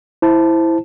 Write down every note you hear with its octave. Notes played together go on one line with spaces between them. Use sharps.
E4 C5 A5